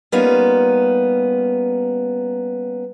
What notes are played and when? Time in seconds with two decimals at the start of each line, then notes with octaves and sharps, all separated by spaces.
0.12 G3 A#3 B3 C#4 D#4 F4